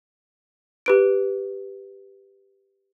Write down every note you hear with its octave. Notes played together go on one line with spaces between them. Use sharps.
G4 B4 D7